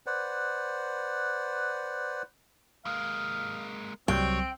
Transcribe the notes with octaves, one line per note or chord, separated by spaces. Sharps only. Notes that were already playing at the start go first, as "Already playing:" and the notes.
B4 C5 D5 F#5
G#3 A#3 F5
C2 F#3 G3 C4 C#5 G5